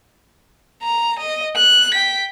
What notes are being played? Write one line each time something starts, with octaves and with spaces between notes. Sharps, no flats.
A#5
D#5
F#6
G5 B6